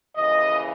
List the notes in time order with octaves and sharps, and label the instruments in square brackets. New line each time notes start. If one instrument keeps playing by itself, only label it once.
[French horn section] D#2 C#3 E3 D#5